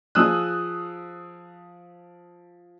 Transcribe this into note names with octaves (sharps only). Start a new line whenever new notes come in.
F3 G#4 D#6 E6 F#6